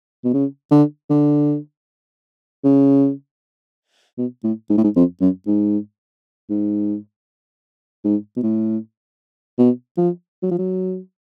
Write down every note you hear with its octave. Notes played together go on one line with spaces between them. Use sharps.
B2
C#3
D3
D3
C#3
B2
A2
G#2
A2
G#2
F2
F#2
G#2
G#2
G#2
B2
A2
B2
F3
F#3
F3
F#3